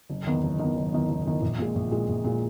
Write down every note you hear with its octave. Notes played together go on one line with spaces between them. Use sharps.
F#1
E2 D#3
F#1
E2 D#3
F#1
E2 D#3
F#1
E2 D#3
A#1
A#2 G#3
A#1
A#2 G#3
A#1
A#2 G#3